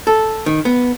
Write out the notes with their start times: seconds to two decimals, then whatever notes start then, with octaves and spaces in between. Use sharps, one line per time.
0.07 A4
0.46 D#3
0.65 B3